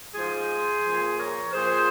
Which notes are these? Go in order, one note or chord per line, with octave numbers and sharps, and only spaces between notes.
G#2 F3 G#4 C5
A#2 F3
A#4 C#5
A#2 F3 G#4 C5